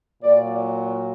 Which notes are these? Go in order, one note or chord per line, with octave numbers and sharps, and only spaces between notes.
A#2 F#3 D5